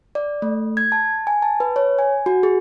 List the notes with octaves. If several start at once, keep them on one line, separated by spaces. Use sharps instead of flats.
D5
A3
G#6
A5
G#5
A5
B4
C#5
G#5
F#4
G#4